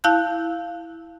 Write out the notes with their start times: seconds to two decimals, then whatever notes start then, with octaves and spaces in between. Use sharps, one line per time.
0.04 E4 F5 A5 F#6 G6